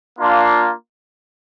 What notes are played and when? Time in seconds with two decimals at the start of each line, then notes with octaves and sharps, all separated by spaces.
0.19 A#3 D4 F4